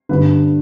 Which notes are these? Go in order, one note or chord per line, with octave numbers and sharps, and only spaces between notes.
G1 G2 D3 B4